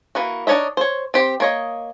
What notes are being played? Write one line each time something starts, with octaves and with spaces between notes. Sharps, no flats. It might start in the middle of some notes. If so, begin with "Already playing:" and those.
E3 A#3 F#4
D4 D#4 C#5 D#5 E5
C5 C#5
C4 G4 C5
A#3 C#5 D#5